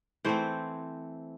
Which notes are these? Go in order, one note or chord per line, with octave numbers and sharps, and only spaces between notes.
E3 A3 C4 C5